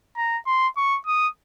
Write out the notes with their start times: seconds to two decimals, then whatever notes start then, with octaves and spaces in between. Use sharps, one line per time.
0.17 A#5
0.47 C6
0.77 C#6
1.07 D#6